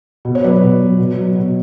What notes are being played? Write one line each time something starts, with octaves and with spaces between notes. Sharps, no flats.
B2
C#5
F#3 B4 D5
C#5
B2
F#3
B2
F#3
B2